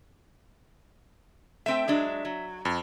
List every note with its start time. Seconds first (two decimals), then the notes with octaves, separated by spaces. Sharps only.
1.66 A3 C4 E5 G5
1.88 F#3 G#3 D4
2.25 F#3
2.65 F2